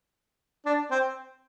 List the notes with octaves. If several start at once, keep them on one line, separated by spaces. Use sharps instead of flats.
D4
C4